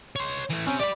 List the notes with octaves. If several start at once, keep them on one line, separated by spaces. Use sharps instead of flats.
C#5 C6
E3 A3
C3 C4 C#4
G4 D5 B5